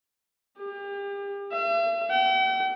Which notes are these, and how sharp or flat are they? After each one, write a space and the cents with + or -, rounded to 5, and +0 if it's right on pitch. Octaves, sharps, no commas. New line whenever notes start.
G4 +35
E5 +45
G5 -45